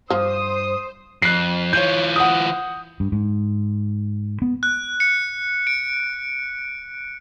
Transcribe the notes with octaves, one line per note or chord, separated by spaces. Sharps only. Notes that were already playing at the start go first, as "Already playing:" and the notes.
G2 F3 C5 D#6
F2 F#6 C7
E3 F4 C#5 G6
F#5 D#6
G2
G#2
B3
F#6
C#7
D7